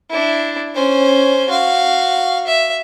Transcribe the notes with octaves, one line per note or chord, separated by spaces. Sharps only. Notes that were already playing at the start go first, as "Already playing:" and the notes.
D4 E4
C#4 C5
F#4 F5
E5